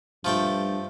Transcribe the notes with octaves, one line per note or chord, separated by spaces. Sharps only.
G2 F3 A3 G5